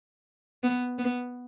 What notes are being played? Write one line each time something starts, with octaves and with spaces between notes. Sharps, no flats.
B3
B3